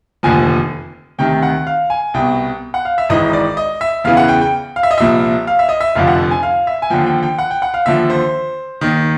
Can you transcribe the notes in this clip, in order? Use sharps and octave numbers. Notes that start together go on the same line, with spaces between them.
F1 D#2 D3 F3 G#5
D2 C3 D#3 G5
F#5
F5
G#5
C2 B2 G5
F#5
F5
E5
G#1 G#2 E3 D#5
D5
D#5
E5
E2 C#3 E3 F5
F#5
G5
G5
F5
E5
D#5
C2 A#2 F3 E5
F5
E5
D#5
E5
F1 F2 D3 F3 F5
F#5
G#5
F5
E5
G#5
D#2 D3 F3 G5
G5
G5
F#5
G5
F#5
F5
D#2 D3 F3 E5
C5
D#2 D#3